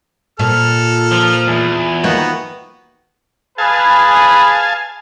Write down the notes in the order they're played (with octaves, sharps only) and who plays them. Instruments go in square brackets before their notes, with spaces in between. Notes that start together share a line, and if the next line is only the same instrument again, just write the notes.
[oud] A#2 [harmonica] A4 F6
[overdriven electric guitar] F3
E2
[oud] D#3 A#3 [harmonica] B3 F#4
[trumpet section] G#4 B4 [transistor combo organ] F5 G#5 A5